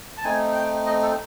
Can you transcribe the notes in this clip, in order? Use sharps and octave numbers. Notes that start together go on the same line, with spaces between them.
A5
A3 C4 D#4 G#5
G5
D#5
A4